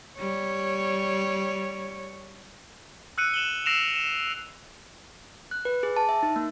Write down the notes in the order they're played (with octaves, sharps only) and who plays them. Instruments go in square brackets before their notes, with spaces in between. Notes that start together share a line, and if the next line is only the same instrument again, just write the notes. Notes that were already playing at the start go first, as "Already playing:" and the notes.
[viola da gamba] G3 C#5
[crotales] E6 F#6 C#7 D#7
E7 F#7 G7
E6 A#6 C7 D7 E7 F7
E7
[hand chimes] F#6
B4
G#4
A5
E5
D#4
A#3